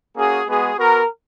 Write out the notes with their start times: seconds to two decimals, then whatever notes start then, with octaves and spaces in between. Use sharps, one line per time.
0.17 A#3 C#4 F#4 G#4
0.48 G#3 B3 F#4 G#4
0.78 B3 F#4 A#4